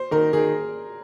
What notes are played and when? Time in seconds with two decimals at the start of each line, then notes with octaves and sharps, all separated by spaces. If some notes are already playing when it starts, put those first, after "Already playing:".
Already playing: C5
0.11 D#3 A#4
0.33 D#3 G#4